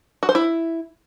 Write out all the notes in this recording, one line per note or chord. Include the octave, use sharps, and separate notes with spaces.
F#4
C5
E4